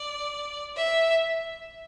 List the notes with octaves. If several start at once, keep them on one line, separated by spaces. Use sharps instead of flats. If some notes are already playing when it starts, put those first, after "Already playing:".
Already playing: D5
E5